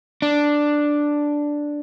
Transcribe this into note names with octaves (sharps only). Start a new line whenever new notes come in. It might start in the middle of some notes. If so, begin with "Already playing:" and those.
D4